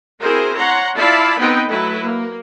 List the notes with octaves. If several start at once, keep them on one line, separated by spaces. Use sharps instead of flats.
C4 E4 F#4 G#4 A#4 C5
C#5 F#5 A#5 C6
E4 F4 D5 F5 A5 B5
B3 C4 D#4 B4 G5
F#3 A3 E4 B4
A#3